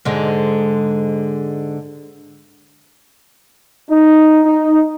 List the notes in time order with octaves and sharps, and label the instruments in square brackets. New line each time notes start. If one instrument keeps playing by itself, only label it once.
[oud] G#2 D3 G#3
[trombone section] D#4
D#4